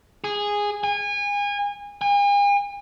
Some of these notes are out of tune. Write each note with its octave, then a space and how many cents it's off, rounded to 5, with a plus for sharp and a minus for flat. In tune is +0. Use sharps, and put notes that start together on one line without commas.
G#4 -10
G#5 -30
G#5 -45